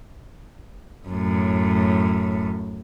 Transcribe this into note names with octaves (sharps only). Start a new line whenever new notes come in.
F#2 A2